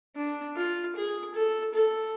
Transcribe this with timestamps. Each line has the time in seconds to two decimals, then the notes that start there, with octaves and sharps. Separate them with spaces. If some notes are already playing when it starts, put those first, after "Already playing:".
0.16 D4
0.56 F4
0.96 G#4
1.35 A4
1.74 A4